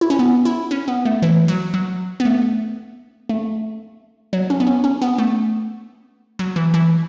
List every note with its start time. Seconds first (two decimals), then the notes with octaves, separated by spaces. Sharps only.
0.01 E4
0.10 C#4
0.19 B3
0.45 E4
0.71 C#4
0.88 B3
1.05 A3
1.22 E3
1.48 F#3
1.74 F#3
2.20 B3
2.25 A3
3.29 A3
4.33 F#3
4.50 C#4
4.60 B3
4.67 C#4
4.84 C#4
5.02 B3
5.18 A3
6.39 F#3
6.56 E3
6.74 E3